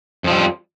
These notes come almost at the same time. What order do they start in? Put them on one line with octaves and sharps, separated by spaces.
F2 F3 G3